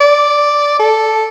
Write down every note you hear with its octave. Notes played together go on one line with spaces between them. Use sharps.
D5
A4